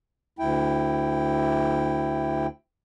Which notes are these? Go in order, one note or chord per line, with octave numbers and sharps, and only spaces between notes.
D2 E4 G5